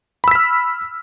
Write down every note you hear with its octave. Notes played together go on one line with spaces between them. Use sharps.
B5 E6 F6 B6